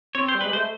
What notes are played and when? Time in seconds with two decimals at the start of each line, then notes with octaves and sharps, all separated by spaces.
0.15 C4 C#5
0.28 C5
0.35 G3
0.41 B4
0.45 G#3
0.53 C5
0.56 A3